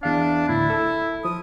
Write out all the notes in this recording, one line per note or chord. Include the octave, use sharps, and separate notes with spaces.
E2 D4 F5
D2 A2 E4
A4
F3 D#6